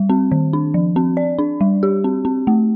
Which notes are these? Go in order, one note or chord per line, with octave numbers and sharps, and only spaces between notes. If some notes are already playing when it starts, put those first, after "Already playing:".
Already playing: G3
C4
D#3
D4
F3
C4
D5
D4
G3
G4
C4
C4
A3